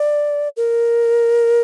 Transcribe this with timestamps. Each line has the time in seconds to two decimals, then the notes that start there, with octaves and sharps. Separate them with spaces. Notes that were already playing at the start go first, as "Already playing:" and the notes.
Already playing: D5
0.57 A#4